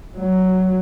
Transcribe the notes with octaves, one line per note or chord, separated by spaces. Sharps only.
F#3